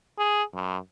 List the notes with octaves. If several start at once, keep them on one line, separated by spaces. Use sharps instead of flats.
G#4
F#2